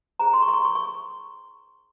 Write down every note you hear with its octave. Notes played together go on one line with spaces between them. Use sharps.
D#4 G#4 C5 A#5
C6
C#6
C6
C#6
C#6
C#6